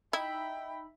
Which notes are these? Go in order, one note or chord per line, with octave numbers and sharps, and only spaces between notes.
D#4 E4 E5 G5 B5